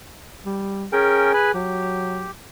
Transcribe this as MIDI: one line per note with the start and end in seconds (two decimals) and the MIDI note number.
0.45 0.86 55
0.93 1.32 61
0.93 1.54 68
0.93 1.32 70
0.93 1.32 79
1.34 1.51 71
1.34 1.51 80
1.34 1.51 83
1.54 2.30 54
1.54 2.31 67